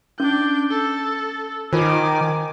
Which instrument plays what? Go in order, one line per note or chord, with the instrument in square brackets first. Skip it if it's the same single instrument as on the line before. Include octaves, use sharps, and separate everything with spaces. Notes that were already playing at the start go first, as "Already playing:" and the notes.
[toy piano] C#4 [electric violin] D4 G6
[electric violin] A4
[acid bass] D#3 [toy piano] F4 C5 [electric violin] G#5 D6